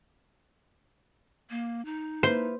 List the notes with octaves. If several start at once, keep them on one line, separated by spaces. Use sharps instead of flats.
A#3
D#4
A#3 E4 B4 C5